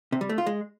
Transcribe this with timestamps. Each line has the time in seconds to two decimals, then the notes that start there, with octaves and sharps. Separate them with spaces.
0.12 C3
0.21 G3
0.29 A3
0.38 F4
0.46 G#3